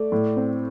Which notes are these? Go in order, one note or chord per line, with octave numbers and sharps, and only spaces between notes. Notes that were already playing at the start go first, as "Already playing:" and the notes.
Already playing: A3 D5
A2
C4